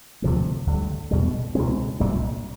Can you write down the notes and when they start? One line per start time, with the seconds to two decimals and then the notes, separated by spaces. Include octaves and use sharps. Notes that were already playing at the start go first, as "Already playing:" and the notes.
0.22 D2 C3 F3 G#3
0.67 D2 D3 G3
1.11 E2 B2 G3
1.55 C#2 B2 G#3 C4
2.00 C2 A#2 G3